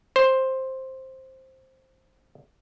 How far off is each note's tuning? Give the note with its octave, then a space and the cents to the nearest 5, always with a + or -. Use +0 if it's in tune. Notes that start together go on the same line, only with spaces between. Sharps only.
C5 +5